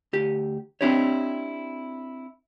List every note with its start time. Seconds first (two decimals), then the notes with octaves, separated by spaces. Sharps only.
0.13 D2 G4
0.81 C4 D4 E4 G4 C#5